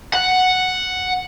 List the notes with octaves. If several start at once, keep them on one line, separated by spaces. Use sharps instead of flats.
F#5